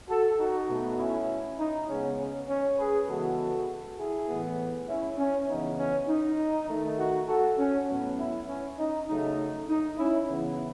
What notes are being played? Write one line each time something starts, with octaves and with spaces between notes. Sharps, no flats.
F#4 A4
D#4 F#4
B2 A3
C#4 E4
D#4
C#3 G#3 B3 C#4
C#4
C#4
G#4 B4
C#3 E3 G#3 B3 F#4 A4
E4 G#4
A2 E3 B3
C#4 E4
C#4
C#3 E3 B3 D#4
C#4
D#4
D#3 A3
D#4 F#4
F#4 A4
C#4
A2 F#3 B3
C#4 E4
C#4
D#4
C#3 F#3 A3 D#4
D#4
C#4 E4
C#3 E3 B3